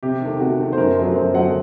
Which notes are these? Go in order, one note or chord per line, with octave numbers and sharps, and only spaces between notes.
C3 G4
D#3 A3
C3 F#4
D#3 A3
C5
F#2 A#4
F#3 A3
F#2 C5
F#3 A3 F#5